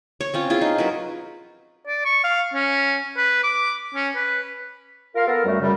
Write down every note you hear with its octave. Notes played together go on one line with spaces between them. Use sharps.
C#5 C#6
C4 C#4 F4
E4 F4 G#4
D#4
F#3 A#4 B4
D5
C#6
F5
C#4
B4
D6
C#4
B4
F4 A#4 F5
B3 A4 A#4
F#2 G3 A3
F#2 C#3 G3